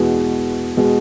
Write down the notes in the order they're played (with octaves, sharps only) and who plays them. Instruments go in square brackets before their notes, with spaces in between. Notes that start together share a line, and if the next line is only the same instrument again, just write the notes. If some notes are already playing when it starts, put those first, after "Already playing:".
Already playing: [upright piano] E2 B2 G#3
B2 G#3